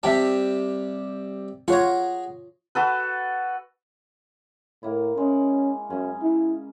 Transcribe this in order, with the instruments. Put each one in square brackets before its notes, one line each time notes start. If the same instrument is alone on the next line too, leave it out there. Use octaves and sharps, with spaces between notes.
[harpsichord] C3 G3 [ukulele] E5 G5 A5
[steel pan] F4 C#5 [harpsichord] G#4 A#5 [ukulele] F#5
[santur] F#4 A4 B4
[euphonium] A2 [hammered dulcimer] A#3 E4
[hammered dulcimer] G#3 [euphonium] C#4
[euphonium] F#2 [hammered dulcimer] C#3
[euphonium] E4